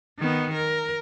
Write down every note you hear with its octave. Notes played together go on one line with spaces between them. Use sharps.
D#3 B3
A#4